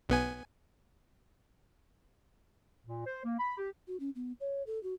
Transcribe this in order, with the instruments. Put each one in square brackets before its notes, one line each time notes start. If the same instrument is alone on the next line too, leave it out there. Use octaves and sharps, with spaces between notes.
[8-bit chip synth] B1 B3 G#5
[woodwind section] A#2
C5
A#3
B5
G4
[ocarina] F#4
C#4
B3
C#5
A4
F#4